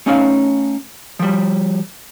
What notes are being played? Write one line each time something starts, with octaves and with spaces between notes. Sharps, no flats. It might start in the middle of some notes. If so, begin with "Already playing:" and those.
A3 C#4 D#4 C#5 F5
F3 G3